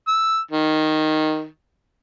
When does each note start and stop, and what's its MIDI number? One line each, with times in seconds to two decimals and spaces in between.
0.08 0.37 88
0.51 1.46 51